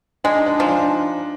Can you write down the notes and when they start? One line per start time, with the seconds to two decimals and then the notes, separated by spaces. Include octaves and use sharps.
0.24 G#3 D4
0.35 D#4
0.46 D4
0.58 F3 D#4
0.68 D4